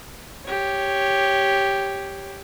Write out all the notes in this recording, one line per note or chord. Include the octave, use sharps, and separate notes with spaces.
G4 C#5